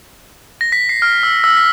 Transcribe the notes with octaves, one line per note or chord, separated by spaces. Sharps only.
A#6
B6
C7
F6
E6
E6
B6